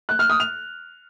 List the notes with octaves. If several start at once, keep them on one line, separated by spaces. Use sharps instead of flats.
F#6
F6
D#6
F7